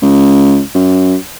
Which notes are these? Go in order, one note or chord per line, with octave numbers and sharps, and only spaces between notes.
C#2
F#2